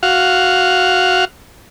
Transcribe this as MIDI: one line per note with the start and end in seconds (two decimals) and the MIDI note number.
0.03 1.25 66
0.03 1.25 77